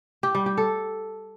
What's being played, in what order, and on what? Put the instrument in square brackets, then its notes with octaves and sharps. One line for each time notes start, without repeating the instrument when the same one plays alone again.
[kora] G4
G3
G4
A4